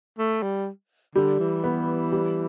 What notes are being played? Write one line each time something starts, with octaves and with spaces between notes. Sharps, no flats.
A3
G3
D3 G3
E3
B3
G3